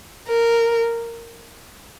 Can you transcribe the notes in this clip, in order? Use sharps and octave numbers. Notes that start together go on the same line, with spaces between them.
A#4